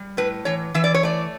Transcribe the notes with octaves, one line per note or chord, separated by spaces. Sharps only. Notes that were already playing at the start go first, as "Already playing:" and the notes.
Already playing: G3
A2 B4
E3 C#5
E3 E5
D5
C#5
A3 D5